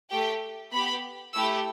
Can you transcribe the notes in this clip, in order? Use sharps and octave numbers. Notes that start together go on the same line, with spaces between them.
A3 G4 G5
B3 G4 B5
A3 E4 G4 E6